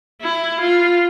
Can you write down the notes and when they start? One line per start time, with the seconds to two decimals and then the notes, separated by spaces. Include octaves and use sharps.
0.22 E4
0.61 F4